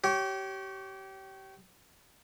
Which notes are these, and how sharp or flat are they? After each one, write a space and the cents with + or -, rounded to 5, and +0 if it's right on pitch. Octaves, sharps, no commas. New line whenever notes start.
G4 -30 C#5 +0